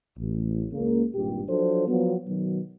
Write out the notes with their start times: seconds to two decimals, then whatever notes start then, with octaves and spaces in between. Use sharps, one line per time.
0.17 A1
0.71 C#2 C#3 A#3
1.13 G#1 G2 A#2 G4
1.46 F3 F#3 D4 A4 C5
1.87 F3 F#3 B3
2.26 B2 D#3 F#3